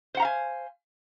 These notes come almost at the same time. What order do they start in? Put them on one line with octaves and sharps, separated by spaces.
C5 F#5 A#5 F5 G#5